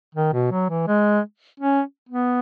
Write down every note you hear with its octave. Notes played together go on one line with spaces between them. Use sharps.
D#3
B2
F#3
E3
G#3
C#4
B3